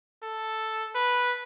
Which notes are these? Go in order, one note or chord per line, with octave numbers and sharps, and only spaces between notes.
A4
B4